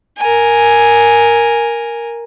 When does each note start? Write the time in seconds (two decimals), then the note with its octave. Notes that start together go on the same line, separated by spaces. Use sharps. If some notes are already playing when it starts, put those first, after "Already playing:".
0.18 A#4 G#5